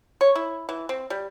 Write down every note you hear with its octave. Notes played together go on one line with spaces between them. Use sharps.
C#5
E4
E3
C4
G3